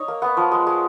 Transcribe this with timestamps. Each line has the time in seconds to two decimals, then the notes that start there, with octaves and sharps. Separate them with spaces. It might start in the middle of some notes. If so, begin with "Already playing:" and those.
Already playing: D#4 C#5
0.08 A#3
0.22 B3 F#5
0.37 F3
0.52 G#3
0.67 G#3